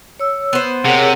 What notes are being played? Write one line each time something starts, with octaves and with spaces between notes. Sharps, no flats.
C#5 E6
B3 C5
C3 G#4 A#4 C#5 F#5